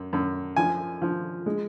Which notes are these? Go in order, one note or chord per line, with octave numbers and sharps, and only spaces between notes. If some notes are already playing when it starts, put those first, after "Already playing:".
Already playing: F#2
F#2
F3 G#5
F3
G#3